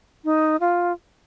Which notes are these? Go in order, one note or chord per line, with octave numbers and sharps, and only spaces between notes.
D#4
F4